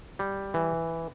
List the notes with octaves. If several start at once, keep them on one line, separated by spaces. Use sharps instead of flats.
G3
E3